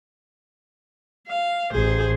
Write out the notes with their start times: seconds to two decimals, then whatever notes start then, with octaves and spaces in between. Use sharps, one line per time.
1.28 F5
1.72 A1 G#4 C5